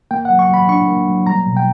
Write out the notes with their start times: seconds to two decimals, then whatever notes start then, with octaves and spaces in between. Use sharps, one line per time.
0.11 A#3 G5
0.25 F#5
0.30 F#3
0.39 C#6
0.49 F#3 B5
0.69 D4 C#6
0.88 A#3
1.08 F#3
1.27 G3 A#5
1.47 B2
1.57 G5